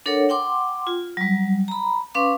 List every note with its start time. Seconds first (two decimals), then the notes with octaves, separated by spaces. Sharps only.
0.06 D4 A4 A#4 C#5 F#5
0.29 F#5 G5 C6 D6
0.87 F4
1.17 F#3 G3
1.68 A#5 B5
2.15 C#4 B4 F5 C6 D6